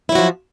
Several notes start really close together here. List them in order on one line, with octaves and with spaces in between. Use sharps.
E4 F#3 F#4 F3